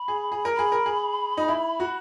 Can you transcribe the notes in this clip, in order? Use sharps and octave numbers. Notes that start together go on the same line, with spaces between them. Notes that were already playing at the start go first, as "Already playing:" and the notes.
Already playing: B5
G#4
G#4
A#4
G#4 B5
A#4
G#4
D#4
E4
F#4